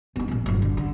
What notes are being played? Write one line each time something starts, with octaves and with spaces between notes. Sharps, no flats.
B3 D#4
A#2 F3
G1 F#3
D3
D3